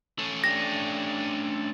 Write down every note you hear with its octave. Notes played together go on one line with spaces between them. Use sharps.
A3 C#4
D4 G4 A#6